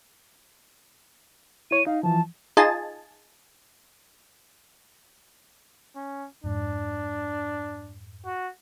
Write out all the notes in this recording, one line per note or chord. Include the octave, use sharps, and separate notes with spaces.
E4 C#5 D#7
D#4 F5
E3 F3 A5
D#4 F4 G#4 D#5 G#5 A5
C#4
F2 G#2 D4
F#4